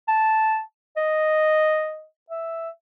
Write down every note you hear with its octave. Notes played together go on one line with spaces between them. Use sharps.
A5
D#5
E5